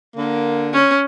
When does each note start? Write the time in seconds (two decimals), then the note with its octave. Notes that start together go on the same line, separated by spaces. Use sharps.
0.16 D3 A#3
0.73 C#4